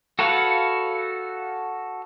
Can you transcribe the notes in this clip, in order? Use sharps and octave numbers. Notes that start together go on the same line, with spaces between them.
F#4 A4 B4 C#5 F5